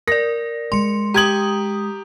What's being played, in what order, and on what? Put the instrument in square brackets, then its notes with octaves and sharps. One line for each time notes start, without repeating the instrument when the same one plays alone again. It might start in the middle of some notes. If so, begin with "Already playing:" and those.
[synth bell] A#4 D5 [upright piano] A#6
[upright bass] G#3 [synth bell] C6 C#7
[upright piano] G4 G#6 F#7 [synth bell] A#5 D#6